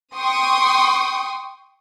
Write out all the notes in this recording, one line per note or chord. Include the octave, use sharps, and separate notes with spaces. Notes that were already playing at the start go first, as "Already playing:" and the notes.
G5 C6 C#6 D#6